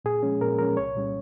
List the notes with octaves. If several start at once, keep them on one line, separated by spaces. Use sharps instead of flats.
A#2 G#4
F3 G#3 C#4
A#2 A#4
F3 G#3 C#4 A#4
C2 C#5
A#2 G3 C#4